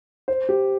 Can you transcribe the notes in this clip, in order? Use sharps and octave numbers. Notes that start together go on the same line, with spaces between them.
C5
G4